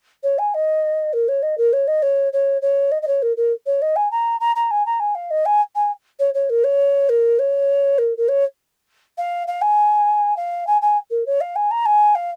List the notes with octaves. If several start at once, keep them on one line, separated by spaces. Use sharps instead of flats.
C#5
G#5
D#5
A#4
C#5
D#5
A#4
C#5
D#5
C#5
C#5
C#5
D#5
D#5
C#5
A#4
A#4
C#5
D#5
G#5
A#5
A#5
A#5
G#5
A#5
G#5
F5
D#5
G#5
G#5
C#5
C#5
A#4
C#5
A#4
C#5
A#4
A#4
C#5
F5
F5
G#5
F5
G#5
G#5
A#4
C#5
F5
G#5
A#5
G#5
F5